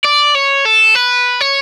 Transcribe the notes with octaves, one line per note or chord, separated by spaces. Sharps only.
D5
C#5
A4
B4
C#5